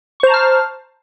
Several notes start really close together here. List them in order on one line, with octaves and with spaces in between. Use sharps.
C#6 C5 A#5 A5 F6